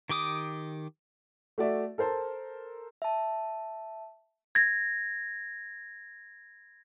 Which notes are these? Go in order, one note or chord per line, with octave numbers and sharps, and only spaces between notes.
D#3 G4 D6 D#6
A3 F#4 D5 E5
A4 A#4 C5 A5
E5 A5
G#6 A#6